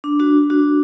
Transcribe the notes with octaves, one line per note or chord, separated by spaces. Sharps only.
D4
D4 F#4
D4 F#4